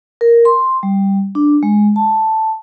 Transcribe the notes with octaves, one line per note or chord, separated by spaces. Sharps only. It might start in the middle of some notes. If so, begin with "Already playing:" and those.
A#4
C6
G3
D4
G#3
A5